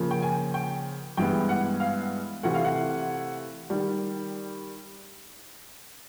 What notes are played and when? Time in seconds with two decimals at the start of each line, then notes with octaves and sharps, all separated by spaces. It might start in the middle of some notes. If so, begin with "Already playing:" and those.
Already playing: C#3 F3 A#3
0.11 G5
0.22 G#5
0.54 G5
1.17 G2 E3 G#3 B3 G5
1.49 F#5
1.80 F5
2.43 C3 E3 A3 F#5
2.55 F5
2.64 F#5
3.70 D#3 G3